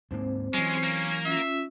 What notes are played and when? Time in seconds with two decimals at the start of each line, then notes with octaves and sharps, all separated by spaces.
0.11 D2 G#2 A#3 C4 C5
0.54 E3 F#3 G#3 C#4
0.84 A#3
1.25 C#4 F4 E5